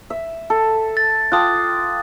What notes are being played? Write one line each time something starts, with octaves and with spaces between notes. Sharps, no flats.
E5
A4
A6
F4 G5 A5 D6 D#6 F#6